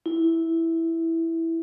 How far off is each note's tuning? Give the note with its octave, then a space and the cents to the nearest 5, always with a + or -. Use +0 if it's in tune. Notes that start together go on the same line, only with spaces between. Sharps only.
E4 -5